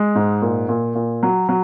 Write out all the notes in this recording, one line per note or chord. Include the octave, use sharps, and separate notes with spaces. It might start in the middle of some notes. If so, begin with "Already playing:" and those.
Already playing: G#3
G#2
A#2
A#2
A#2
F#3
F#3